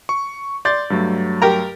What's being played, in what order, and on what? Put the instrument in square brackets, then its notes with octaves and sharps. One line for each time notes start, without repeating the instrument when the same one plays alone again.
[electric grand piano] C#6
[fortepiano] D5 [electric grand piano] C6 G6 A6
[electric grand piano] G2 F#3 A3
[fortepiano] G4 A#4 A#5